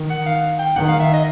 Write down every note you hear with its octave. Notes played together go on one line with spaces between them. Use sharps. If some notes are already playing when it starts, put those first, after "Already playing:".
Already playing: D#3
F#5
F5
G5
D#3 F#5
F5
E5
D#5